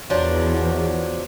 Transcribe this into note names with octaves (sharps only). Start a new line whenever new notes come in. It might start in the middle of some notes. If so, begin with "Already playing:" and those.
E2 F3 F#3 D4